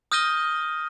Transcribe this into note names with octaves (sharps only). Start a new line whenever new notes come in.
D#6 F6 G6 A#6 D#7 G7